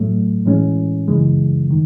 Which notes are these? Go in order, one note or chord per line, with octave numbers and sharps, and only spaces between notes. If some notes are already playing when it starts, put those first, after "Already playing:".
Already playing: A2 F#3 A3
A2 E3 G#3 C#4
F#2 C#3 E3 G#3
D#3